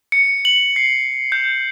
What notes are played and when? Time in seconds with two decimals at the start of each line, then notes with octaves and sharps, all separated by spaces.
0.12 C#7
0.45 F#7
0.76 C7
1.32 G6